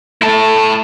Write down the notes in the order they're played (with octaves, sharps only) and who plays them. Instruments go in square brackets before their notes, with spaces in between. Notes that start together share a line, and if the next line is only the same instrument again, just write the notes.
[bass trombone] A3 [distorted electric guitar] E4 A5